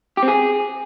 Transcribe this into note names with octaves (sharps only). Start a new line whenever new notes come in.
G4
C4
G#4